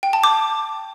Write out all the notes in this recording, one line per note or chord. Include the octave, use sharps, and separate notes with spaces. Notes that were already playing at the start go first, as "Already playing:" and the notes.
G5
A5
D6